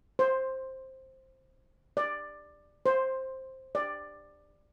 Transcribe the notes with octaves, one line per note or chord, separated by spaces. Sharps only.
C5
D5
C5
D5